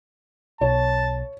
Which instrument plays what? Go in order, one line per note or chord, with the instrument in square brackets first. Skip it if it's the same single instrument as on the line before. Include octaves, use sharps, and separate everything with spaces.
[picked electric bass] B1 [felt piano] C#5 [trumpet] A5